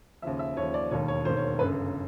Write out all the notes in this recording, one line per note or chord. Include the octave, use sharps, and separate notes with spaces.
D#2 C#3 F3 E5
E5
D#2 C#3 F3 C#5
D5
E1 D#2 D#3 C#5
C#5
E1 D#2 D#3 C5
C#5
G1 F#2 C#3 B4